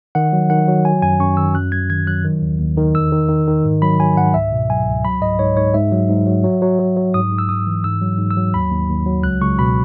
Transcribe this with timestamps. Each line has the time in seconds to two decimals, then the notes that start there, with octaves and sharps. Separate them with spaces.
0.15 D#3 F#5
0.33 F#3
0.50 D#3 F#5
0.68 F#3
0.85 F#3 G#5
1.02 F#2 G#5
1.20 F#2 C#6
1.37 D#3 E6
1.55 F#2 F#6
1.72 F#3 G#6
1.90 D#3 G#6
2.07 F#3 F#6
2.25 D#3
2.42 D#2
2.60 D#2
2.77 D#3
2.95 E2 E6
3.12 D#3
3.29 D#3
3.47 D#3
3.64 G#2
3.82 F#3 B5
4.00 F#3 G#5
4.17 G#2 F#5
4.34 C#2 E5
4.52 B2
4.69 F#3 G#5
4.87 C#2
5.05 F#3 B5
5.21 G#2 D#5
5.39 G#2 C#5
5.57 G#2 C#5
5.74 G#2 E5
5.92 F#3
6.09 G#2
6.26 F#3
6.44 F#3
6.62 F#3
6.79 F#3
6.97 F#3
7.14 G#2 D#6
7.32 G#2
7.38 E6
7.49 G#2 D#6
7.67 E3
7.84 G#2 E6
8.02 F#3
8.18 G#2
8.31 E6
8.37 F#3
8.54 D#2 B5
8.71 D#2
8.89 D#2
9.06 F#3
9.23 C#2 F#6
9.41 C#2 C#6
9.59 B2 B5